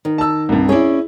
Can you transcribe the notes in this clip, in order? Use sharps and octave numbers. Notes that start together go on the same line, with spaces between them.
D#3
A5 E6
C2 G2
C#4 E4 G#4 C#5 D5